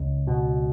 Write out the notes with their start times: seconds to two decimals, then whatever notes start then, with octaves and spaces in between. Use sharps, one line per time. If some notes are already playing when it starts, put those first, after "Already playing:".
Already playing: C#2
0.27 B2